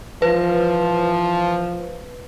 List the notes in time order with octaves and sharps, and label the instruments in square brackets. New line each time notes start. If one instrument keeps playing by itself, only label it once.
[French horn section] E3 F3 [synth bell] B4